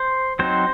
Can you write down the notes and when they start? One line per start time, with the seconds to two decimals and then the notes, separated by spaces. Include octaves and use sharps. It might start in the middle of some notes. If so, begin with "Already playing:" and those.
Already playing: C5
0.39 F#3 C4 D#4 C5